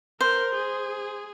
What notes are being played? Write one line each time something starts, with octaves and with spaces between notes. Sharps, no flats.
A#4 C5
G#4